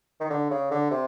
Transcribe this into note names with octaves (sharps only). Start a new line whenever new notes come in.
D#3
D3
C#3
D3
C3